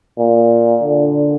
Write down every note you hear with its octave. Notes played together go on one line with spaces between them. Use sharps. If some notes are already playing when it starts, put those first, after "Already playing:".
A#2
D3